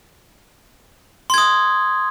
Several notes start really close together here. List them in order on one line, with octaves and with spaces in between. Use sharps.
C6 G#6 D#6